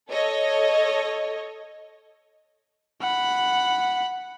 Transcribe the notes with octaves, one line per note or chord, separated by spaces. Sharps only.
A4 C#5 D#5
F#5 B5